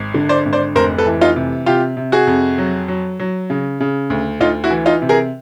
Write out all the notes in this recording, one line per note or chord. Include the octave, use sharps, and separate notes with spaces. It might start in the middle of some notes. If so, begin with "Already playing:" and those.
Already playing: G#1
D3
C5 D5
G#1
C5 D5
F1 A#4 C5
A4 B4
E3
D#4 F4
C3
C3 F4 G4
C3
F#4 G#4
F2
F#3
F#3
F#3
C#3
C#3
D2
D2 D#4 F4
E4 F#4
E3
D#4 F4
C3
G#4 A#4